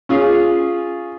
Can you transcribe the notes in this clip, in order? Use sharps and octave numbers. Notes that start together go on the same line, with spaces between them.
C#4 F4 G#4